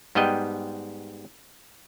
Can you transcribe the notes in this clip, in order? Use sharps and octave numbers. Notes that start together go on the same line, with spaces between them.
G#2 G3 B3 D#5 G5